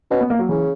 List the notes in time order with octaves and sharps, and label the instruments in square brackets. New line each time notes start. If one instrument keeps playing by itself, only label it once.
[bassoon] B2 [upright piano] C#4
[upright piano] B3
A#3
F#3
[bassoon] C#3 [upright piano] E3